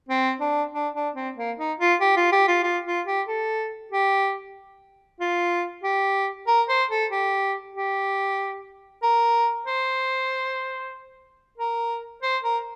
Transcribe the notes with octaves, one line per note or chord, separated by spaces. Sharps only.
C4
D4
D4
D4
C4
A#3
D#4
F4
G4
F4
G4
F4
F4
F4
G4
A4
G4
F4
G4
A#4
C5
A4
G4
G4
A#4
C5
A#4
C5
A#4